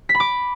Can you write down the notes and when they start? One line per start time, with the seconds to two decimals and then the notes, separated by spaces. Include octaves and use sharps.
0.09 B6
0.15 B5
0.20 D6